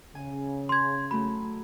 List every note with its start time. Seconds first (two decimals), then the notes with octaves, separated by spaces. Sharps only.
0.15 C#3 G#5
0.69 C6 G#6
1.11 F#3 A3 B5